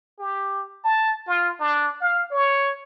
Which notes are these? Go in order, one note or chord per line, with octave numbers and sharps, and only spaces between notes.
G4
A5
F4
D4
F5
C#5